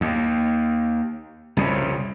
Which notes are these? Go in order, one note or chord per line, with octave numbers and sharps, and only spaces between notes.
D#2
C2 F2 C#3